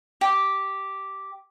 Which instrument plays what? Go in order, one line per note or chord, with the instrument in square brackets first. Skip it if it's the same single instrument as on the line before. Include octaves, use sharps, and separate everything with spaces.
[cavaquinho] G4